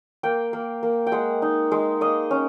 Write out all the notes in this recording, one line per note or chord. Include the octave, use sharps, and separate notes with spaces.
A#3 G5
A#3
A#3
G5
G#3 F#5
D#4
G#3
A#3 D#5
C#4